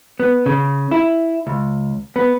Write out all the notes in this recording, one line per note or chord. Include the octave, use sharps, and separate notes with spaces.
B3
C#3
E4
C#2
B3